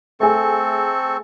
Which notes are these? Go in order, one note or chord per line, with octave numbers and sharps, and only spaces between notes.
A3 C4 G#4 A4 C#6